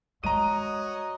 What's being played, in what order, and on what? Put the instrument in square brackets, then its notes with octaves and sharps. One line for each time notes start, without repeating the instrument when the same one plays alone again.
[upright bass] G#3 [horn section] F#4 C#5 D#5 [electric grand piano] A#5 D#7